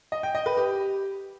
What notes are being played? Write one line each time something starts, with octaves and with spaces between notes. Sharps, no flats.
D#5
G5
D#5
B4
G4